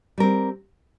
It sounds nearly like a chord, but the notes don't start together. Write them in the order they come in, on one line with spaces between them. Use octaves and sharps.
G3 A#4 C4